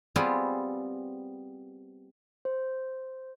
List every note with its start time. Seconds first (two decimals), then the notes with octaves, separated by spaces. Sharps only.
0.16 G3 B3 C4 F4 G4 G#4
2.45 C5